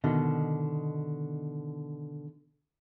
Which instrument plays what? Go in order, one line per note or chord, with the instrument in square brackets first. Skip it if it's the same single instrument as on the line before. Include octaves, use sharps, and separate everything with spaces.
[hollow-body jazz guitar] B2 D3 D#3